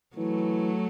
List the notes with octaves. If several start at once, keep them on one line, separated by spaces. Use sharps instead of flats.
E3 F#3 A3